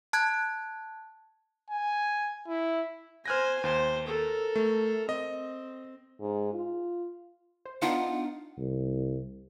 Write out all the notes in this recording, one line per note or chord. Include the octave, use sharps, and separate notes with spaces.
A5 F#6 G#6
G#5
E4
C5 G#5 F6 F#6 A#6
D#2 C5
A4 A#4
A3
C4 D#5
G#2
F4
C5
B3 D4 D#4 F4 F#5
C2